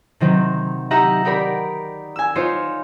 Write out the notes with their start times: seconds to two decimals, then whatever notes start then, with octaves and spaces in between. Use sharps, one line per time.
0.20 C3 D#3 F#3 C4 D#4
0.91 D#4 G4 D#5 E5 F#5 A#5
1.25 D#4 G4 A#4 D5 B5
2.16 G#5 E6
2.36 D#4 F4 C5 C#5